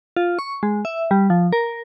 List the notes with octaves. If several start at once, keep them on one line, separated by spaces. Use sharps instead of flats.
F4
C#6
G#3
E5
G3
F3
A#4